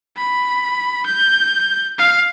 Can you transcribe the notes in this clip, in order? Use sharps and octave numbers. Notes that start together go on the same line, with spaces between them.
B5
G6
F5